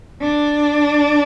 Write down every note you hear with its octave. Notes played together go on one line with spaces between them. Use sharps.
D4